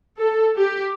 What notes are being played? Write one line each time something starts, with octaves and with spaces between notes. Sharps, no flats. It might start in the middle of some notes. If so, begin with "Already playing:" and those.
A4
G4